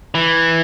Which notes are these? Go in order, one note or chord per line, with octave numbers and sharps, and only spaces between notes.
E3